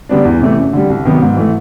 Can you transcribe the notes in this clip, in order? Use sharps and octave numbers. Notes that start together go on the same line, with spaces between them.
D3 G3 B3 D4
E2
C3 E3 A3
F#2
D3 G3
C2
C3 D#3 F#3 B3
G#2
E3 A3